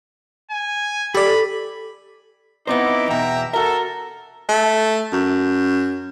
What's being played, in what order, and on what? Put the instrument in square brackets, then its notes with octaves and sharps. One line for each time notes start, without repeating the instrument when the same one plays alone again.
[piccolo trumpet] G#5
[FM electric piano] G4 D5 [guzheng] A4 [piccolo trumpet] B5
[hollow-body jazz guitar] B3 C4 C5 [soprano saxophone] D#4 [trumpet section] E4 D6
[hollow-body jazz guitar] E2 B2 [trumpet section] E5 G5 A#5
[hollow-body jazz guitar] F#4 E5 [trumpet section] A4 [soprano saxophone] A#4
[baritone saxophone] A3
F#2